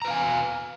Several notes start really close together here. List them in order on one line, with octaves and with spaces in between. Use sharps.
A#5 B4 F5 G#5